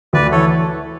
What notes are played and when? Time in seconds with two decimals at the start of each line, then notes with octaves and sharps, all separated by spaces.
0.13 D2 B4 D5
0.32 E3 A4 C#5